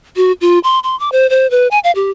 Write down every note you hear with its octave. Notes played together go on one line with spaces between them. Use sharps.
F#4
F4
C6
C6
D6
C5
C5
B4
G#5
F5
G4